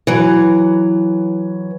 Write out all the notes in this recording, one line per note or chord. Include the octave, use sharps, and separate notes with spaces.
E3 F#3